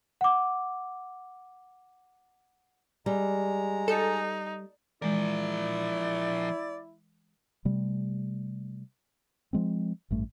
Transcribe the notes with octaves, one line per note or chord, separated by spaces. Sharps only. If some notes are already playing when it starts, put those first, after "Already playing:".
F#5 D6
G3 G#3 A#5
D#4 A4
E3 F3 G#3 E4 A#4 D5
C3 G3 A3
F3 G#3 C4
A1 G2 A3